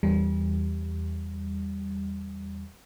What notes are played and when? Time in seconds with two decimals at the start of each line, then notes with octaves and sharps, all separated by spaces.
0.03 E2 G3